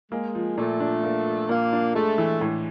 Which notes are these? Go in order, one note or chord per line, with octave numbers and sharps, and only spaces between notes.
G#3 A#3
F3
A#2 A3
D4
A#3
F3
A#2 A#3
D4
G#3 A3
E3
A2